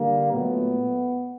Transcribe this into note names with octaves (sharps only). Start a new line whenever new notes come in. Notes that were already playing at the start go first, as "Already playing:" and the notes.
Already playing: D3 G3 A#3
A#2 F#3 A3 B3